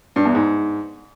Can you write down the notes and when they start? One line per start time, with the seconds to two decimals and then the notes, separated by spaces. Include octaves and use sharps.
0.16 G2
0.25 E2
0.35 G#2